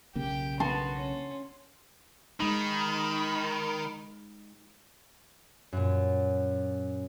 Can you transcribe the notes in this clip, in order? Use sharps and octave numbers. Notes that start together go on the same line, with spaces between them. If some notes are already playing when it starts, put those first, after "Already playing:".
B1 C#3 A#3 G4 G5
B3 F#4 A5 C6
C#4
D#3 G#3 D#4 B5
F#2 A#2